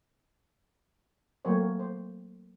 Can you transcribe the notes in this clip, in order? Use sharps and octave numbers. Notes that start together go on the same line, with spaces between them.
F#3 A3 A#3 C4 C5 C#5
C5